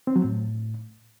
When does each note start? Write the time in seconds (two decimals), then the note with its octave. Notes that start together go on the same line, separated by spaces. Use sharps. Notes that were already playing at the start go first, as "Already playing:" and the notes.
0.07 C4
0.16 F#3
0.24 A2